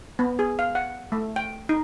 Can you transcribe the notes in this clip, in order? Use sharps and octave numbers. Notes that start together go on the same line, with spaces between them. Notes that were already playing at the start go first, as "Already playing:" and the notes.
B3
G#4
F5
F#5
A3
G5
D#4